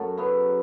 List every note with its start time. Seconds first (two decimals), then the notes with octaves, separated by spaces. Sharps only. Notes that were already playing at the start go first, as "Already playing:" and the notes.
Already playing: F#2 A3 F#4
0.17 C#3 F#3 B3 E4